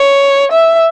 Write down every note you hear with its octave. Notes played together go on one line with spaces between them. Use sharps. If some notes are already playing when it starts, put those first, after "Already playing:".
Already playing: C#5
E5